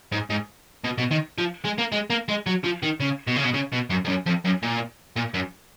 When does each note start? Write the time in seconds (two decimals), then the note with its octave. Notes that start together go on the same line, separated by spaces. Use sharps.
0.12 G#2
0.30 G#2
0.84 B2
0.98 B2
1.11 D#3
1.38 F3
1.65 G#3
1.79 A#3
1.92 G#3
2.10 A#3
2.28 G#3
2.47 F#3
2.64 F3
2.83 D#3
3.00 C#3
3.27 B2
3.36 C#3
3.44 B2
3.54 C#3
3.73 B2
3.90 F#2
4.05 F2
4.08 F#2
4.26 F2
4.45 F#2
4.62 A#2
5.16 A#2
5.34 F#2